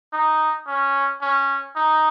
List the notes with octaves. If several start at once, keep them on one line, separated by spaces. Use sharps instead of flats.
D#4
C#4
C#4
D#4